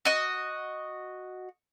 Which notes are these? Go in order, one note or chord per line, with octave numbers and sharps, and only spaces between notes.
F#4 D#5